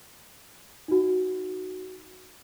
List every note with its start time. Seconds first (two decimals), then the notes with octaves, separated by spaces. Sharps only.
0.88 D#4 F#4